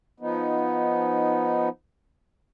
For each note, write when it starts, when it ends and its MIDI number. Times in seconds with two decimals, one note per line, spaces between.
0.20 1.69 53
0.20 1.69 59
0.20 1.69 63